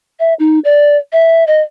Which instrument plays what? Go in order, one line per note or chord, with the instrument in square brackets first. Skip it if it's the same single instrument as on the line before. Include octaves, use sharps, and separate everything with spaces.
[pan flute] E5
D#4
D5
E5
D#5